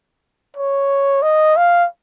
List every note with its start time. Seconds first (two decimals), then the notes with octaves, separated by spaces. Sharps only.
0.56 C#5
1.22 D#5
1.56 F5